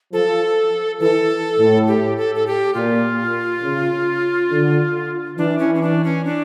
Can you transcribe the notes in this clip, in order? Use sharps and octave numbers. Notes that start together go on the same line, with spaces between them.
F3 A4
E3 A4
A2
G4
A4
A4
G4
A#2 F4
C#3
D3
E3 D4
C#4
C#4
D4
C#4
D4